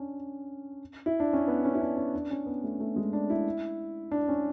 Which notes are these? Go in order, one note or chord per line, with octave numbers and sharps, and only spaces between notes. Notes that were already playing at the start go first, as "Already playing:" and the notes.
Already playing: C#4 D4
E4
D4
C#4
B3
C#4
E4
D4
C#4
D4
C#4
B3
A3
A3
G#3
D4
E4
D4
C#4